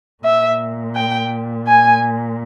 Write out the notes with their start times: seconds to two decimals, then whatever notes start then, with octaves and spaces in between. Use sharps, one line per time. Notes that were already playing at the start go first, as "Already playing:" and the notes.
0.24 A#2 E5
0.95 G5
1.67 G#5